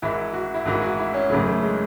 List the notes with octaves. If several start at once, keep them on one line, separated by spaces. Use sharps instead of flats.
G#1 G#2 E3 E4
F#4
E4
G#1 G#2 E3 F#4
F#4
E4
C#4
G#1 F#2 C#3 E3 A3
A3
G#3